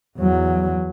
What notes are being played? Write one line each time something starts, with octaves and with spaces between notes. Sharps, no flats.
E2 F#3